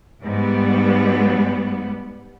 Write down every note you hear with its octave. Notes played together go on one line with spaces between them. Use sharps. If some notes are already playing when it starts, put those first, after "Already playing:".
G#2 G3 B3